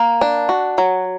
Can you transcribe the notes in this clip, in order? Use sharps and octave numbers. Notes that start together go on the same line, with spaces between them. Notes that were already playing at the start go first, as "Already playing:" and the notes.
Already playing: A#3
D4
F#4
F#3